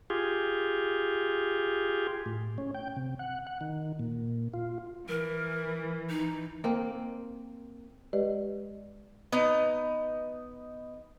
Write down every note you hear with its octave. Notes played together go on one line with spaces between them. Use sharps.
F4 G4 G#4
A2
C#4
G5
C3
F#5
F#5
D#3
A#2
F4
E3 A#4
D#4
A#3 C4
G#3 G4 B4 D5 D#5
B3 D#4 D#5